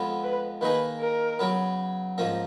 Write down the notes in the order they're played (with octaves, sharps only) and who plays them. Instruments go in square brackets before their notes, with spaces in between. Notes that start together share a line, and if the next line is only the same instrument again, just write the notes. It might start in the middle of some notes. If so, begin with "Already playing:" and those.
Already playing: [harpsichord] F2 F3 G#3 B3
[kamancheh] B4
[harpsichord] D#3 A#3 D#4 G#4 [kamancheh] B4
[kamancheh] A#4
[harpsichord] C#3 F#3 B3
G#2 F3 A#3 C#4